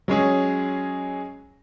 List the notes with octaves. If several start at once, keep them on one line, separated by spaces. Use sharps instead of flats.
F#3 G#3 C#4 G#4